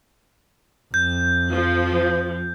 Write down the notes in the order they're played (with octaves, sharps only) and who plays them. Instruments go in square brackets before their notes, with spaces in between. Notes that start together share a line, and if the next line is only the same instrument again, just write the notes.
[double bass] F2 [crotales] G6
[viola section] F3